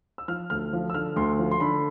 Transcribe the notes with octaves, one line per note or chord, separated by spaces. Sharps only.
E6
F3 F6
D2 F6
F3
E6
D3 F6
D2 C6
F3
C6
D3 B5